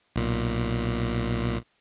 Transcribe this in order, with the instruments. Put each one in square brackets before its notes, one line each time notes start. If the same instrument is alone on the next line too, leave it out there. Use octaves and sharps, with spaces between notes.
[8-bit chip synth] B1 A#2